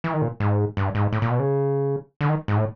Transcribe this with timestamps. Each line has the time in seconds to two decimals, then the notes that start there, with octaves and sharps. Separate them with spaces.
0.04 E3
0.13 D#3
0.22 A#2
0.40 G#2
0.77 G2
0.95 G#2
1.13 A2
1.22 A#2
1.30 B2
1.39 C#3
2.21 D3
2.29 D#3
2.48 G#2
2.57 A2